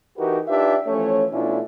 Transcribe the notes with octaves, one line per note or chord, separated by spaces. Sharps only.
E3 D#4 F#4 G4 A#4 B4
D4 D#4 F4 G4 B4 E5
E3 F3 A3 C#4 C#5
B2 A3 C#4 D4 E4 F4